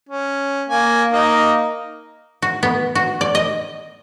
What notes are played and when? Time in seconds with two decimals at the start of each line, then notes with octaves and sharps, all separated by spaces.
0.09 C#4
0.69 A#3 G#5
1.12 A#3 D#4
2.42 F#4
2.63 B3
2.95 F#4
3.21 D5
3.35 D#5